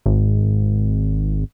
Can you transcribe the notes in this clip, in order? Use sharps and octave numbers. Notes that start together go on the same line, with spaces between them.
G#1